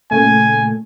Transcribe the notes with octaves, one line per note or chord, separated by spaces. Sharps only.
A#2 C#3 A3 G#5